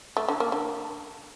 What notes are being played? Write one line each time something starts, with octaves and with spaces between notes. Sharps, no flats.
A3
D3
A#3
D3